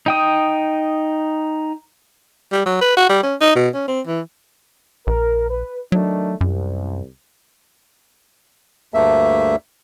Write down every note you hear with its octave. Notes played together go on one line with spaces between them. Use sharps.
D#4 G5 D#6
G3
F#3
B4
F#4
G3
C#4
D#4
B2
C#4
C4
E3
A#1 A#4
B4
D#3 F#3 A3 D4
C2 F#2
D2 G2 A3 A#3 E5